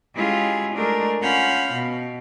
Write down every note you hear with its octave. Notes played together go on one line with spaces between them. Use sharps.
G#3 C#4 E4 F4 G4 G#4
G#3 A3 D4 A#4
C#4 F4 F#5 B5 F6 G6
B2